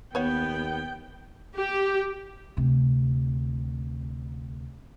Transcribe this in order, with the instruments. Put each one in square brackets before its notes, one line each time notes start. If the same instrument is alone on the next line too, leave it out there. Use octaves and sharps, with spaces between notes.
[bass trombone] D#2 [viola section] B3 [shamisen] B4 C#5 F#5 [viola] G5
[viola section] G4
[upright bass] D2 C3